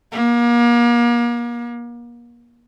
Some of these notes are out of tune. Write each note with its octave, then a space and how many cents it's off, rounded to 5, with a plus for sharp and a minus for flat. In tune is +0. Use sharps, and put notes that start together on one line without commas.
A#3 +35